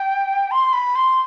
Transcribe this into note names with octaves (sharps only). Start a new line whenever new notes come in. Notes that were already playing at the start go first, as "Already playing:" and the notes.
Already playing: G5
C6
B5
C6